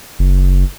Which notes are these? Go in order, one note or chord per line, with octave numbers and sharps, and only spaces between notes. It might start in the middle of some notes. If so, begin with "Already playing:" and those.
F#1